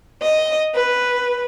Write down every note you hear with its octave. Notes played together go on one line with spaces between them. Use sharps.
D#5
B4